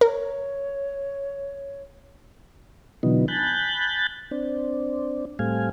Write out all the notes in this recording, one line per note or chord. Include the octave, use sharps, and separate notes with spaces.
A#4 C#5
B2 D3 E3 F#3 B3 D#4
G#5 A5 B5 F#6 G6 A6
C4 D4
A2 G3 A3 C4 F5 G#5